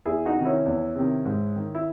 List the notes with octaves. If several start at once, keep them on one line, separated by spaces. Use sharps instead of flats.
E2 E4 G#4
D#4 F#4
C3 D#3
C#4 E4
E2
C3 D#3
G#2
D#3
E4